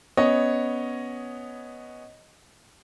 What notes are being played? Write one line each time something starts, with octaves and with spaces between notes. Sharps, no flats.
B3 C#4 C#5 D#5